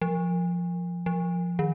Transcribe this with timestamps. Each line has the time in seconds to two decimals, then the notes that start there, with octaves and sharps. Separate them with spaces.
0.02 F3
1.06 F3
1.59 D#3